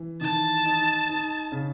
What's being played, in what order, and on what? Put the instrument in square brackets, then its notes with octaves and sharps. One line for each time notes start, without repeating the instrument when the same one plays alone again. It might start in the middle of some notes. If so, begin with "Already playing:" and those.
Already playing: [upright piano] E3
[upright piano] D#3 [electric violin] A5
[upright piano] D#4
D#4
C#3